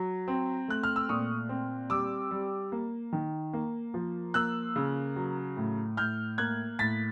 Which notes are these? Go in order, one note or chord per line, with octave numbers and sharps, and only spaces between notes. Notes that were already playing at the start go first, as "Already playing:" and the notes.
Already playing: F#3
C4
A3 F#6
F6
E6
A#2 C#6 D#6
C4
G3 D6 E6
G3
A#3
D#3
A#3
F3
A#3 E6 F#6
C#3
F#3
A2
A2 F6 G6
A#3 F#6 G#6
A2 A6 B6